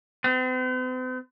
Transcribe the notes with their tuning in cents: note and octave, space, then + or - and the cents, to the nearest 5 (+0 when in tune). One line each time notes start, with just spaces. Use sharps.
C4 -45